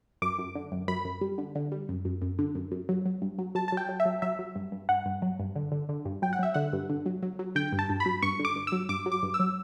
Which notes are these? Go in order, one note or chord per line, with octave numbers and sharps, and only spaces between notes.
F#2 D6
F#2
D3
F#2
F#2 B5
F#2
G3
D3
D3
G3
F#2
F#2
F#2
D3
F#2
F#2
F#3
F#3
G2
F#3
F#3 A5
F#3 A5
G5
F#3
E5
F#3
F#3 E5
F#3
G2
G2
G2 F#5
G2
F#3
G2
D3
D3
D3
G2
F#3 G5
F#5
F#3 E5
D3 F#5
G2
D3
F#3
F#3
F#3
D3 G5
G2
A5
G2
B5
F#3
G2 C#6
D3
D6
G2
F#3 E6
G2 D6
F#3
D6
G2
E6
F#3